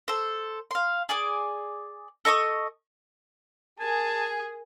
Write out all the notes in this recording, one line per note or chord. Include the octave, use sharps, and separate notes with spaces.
A4 C5
F5 C6
G#4 D5 G#5 D6
A4 D#5 C#6 D#6
G#4 A#4 G#5 A5